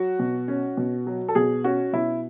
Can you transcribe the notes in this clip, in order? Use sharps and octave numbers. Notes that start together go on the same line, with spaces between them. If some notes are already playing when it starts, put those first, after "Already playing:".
Already playing: F#3 F#4
B2
C#4
B2
F#3
A4
B2 G#4
C#4 F#4
B2 E4